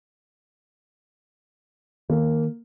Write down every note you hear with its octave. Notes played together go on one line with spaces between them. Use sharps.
D#3 A#3